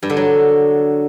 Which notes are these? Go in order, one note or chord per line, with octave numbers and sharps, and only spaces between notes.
G2
D3
F#3